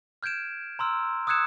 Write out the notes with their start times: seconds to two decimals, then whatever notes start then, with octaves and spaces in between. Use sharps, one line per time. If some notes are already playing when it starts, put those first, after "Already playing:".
0.23 F6 G6 G#6 D7 E7
0.79 A#5 C6 E6 F6
1.27 D#6 E6 F#6 G#6 C#7 E7